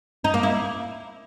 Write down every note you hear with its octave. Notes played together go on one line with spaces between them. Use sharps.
D#4
A#3
E4